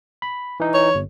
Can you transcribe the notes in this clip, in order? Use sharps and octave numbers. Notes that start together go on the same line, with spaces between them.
B5
E3 D#4
C#5
G1